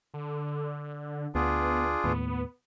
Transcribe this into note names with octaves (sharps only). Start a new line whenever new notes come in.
D3
D2 B3 D4 F4 G#4
D#2 A2 B3